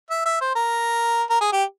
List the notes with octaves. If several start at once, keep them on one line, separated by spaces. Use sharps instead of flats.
E5
E5
C5
A#4
A#4
G#4
G4